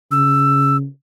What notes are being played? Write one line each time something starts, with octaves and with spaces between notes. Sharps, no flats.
C#3 E6